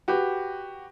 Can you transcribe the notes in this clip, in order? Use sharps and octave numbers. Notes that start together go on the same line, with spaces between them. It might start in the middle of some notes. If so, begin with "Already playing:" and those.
F#4 G4 B4